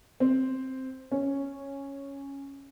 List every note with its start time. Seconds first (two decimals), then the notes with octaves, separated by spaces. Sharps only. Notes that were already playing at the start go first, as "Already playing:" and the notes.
0.20 C4
1.12 C#4